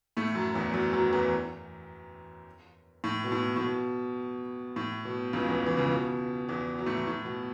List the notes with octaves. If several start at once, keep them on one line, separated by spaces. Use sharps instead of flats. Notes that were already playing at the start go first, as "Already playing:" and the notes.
A2 A3
F#2 F#3
E2 E3
F#2 F#3
F#2 F#3
F#3
E2 E3
A2
B2
A2
A2
B2
A2
B2
C#2 C#3
E2 E3
E3
C#2 C#3
B2
E2 E3
F#3
A2 A3
A2
B2